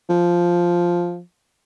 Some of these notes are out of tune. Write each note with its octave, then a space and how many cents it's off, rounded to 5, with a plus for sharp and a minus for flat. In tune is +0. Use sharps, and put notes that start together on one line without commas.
F3 +0